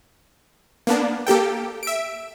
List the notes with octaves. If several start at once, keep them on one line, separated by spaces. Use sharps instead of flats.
A#3 B3 D4
A#3 G4 A4 G5
E5 D7